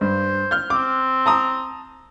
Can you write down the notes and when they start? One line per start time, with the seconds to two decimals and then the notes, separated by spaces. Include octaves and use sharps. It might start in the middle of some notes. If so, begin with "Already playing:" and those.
0.01 G2 C5
0.51 F6 G6
0.70 C4 D6
1.26 A5 A#5 D#6